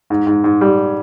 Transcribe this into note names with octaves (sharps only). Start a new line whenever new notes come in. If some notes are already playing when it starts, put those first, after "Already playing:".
G#2
G#2
G#2
G3